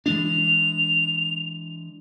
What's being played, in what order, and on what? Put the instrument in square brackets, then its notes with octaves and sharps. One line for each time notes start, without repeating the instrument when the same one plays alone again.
[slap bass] E3 G#3 D4 [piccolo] F7